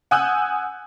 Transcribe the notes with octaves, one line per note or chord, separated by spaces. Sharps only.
F#5 G#5 D#6 E6 F#6 G6